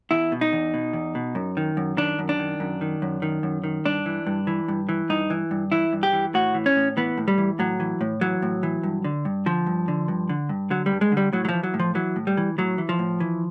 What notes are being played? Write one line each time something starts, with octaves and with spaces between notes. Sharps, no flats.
E2 E4
B2
D#4
E2
B2
E2
B2
F#2
D#3
F#2
D#3 D4
F#2
D4
D#3
F#2
D#3
F#2
D#3
F#2
D#3
G2 D4
E3
G2
E3
G2
E3
G2 D#4
E3
G2
E3 E4
G2
G4
E3
A2 F#4
E3
C#4
A2
E3 B3
A2
G3
E3
A2 F#3
E3
A2
E3 F#3
A2
E3
G2
D3
G2
D3 F3
G2
D3
G2
D3
G2
D3 F#3
G3
G2
G#3
D3
G3
A2 F#3
F#3
E3 F3
F#3
A2
F3
E3 F#3
A2
G3
E3
A2 F#3
E3
F3
A2
E3